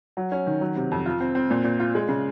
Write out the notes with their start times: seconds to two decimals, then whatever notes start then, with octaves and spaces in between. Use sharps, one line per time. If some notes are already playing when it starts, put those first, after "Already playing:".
0.17 F#3
0.32 C#4
0.46 D#3
0.61 F#3
0.76 C3
0.91 F2
1.06 F4
1.20 C4
1.35 C4
1.50 A#2
1.64 A#2
1.80 F4
1.95 G#3
2.09 C#3